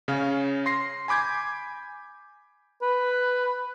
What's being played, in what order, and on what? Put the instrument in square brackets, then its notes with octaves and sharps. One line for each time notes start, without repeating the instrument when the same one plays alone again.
[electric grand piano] C#3 C#4 F5
C6 A#6 C7
G#5 B5 D6 G6 G#6
[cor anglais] B4